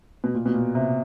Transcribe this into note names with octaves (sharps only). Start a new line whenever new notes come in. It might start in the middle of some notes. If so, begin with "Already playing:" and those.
B2
A#2
B2
A#2
C3